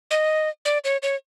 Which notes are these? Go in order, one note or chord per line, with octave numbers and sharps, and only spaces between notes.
D#5
D5
C#5
C#5